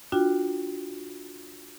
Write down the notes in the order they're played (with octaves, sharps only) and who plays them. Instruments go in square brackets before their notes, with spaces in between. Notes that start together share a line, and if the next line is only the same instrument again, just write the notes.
[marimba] D4 F4 F#4 G5